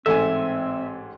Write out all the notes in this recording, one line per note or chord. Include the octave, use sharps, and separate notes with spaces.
A1 G#2 C4 A4 E5 G#5